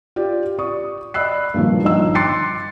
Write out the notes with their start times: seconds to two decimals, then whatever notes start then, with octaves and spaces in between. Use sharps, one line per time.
0.16 F4 G4 D5
0.59 D5 C#6 D#6
1.14 D5 D#5 B5 E6 F#6 C7
1.54 G2 A#2 D#3 F3
1.83 G1 F3 D#4 D#5 E6
2.15 C6 D6 F#6 A6 C7 C#7